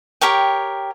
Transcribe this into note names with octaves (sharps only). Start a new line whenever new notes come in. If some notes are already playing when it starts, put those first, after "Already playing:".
G4 A#4 C#5 G5